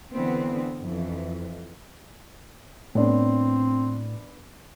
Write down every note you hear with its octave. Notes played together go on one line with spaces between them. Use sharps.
D3 E3 B3 C4
F2 E3
A2 B3 C4 D4